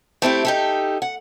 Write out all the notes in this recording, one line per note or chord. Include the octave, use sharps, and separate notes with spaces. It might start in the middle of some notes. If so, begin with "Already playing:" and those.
A3 C4 E4 G4
D#4 G4 A4
F#5